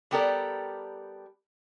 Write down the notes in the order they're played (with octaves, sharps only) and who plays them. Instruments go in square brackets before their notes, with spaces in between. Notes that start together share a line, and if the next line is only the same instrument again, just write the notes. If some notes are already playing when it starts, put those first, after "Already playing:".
[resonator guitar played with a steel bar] G3 B3 G4 A4 A#4 D5